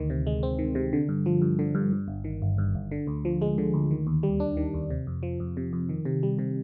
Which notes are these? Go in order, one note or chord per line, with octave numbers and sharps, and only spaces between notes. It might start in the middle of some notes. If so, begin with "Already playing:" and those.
Already playing: D2 D#3
C3
G#3
C4
D#3
C3
D3
G2
F3
G2
D3
G2
G2
G1
D#3
G1
G2
G1
D3
D2
F3
G#3
D3
D2
D#3
D#2
G3
D4
D#3
D#2
C3
F2
F3
F2
C3
F2
D#3
C3
G3
C3